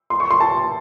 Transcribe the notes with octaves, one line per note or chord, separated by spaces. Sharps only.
C6
C#6
C6
A5